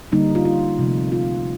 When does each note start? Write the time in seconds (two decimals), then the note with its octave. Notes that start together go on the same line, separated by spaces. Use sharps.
0.12 D3 G3 A#3 D#4
0.35 F4
0.45 F4
0.79 C3 F3 A3
1.12 F4